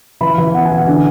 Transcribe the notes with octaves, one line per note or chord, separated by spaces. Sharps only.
E3 B5
E3
B3 F#5
G#5
E3
F#5
D3